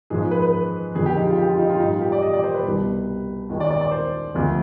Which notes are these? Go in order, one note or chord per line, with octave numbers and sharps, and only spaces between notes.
G#2 F3 G#3 G#4
B4
B4
F2 D3 G#3 G#4
G4
D#4
F4
G4
F4
D#4
F4
G#2 G3 D#4
F4
G4
D5
D#5
D5
C5
B4
C2 B2 G3
D#2 D#3 G#3
D5
D5
D5
C5
D2 C3 F3 G#3